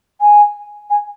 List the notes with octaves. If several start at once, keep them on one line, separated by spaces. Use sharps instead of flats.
G#5
G#5